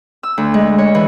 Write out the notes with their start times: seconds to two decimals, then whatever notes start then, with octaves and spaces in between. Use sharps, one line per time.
0.23 E6
0.38 D2
0.54 G#3
0.78 C#5
0.95 E3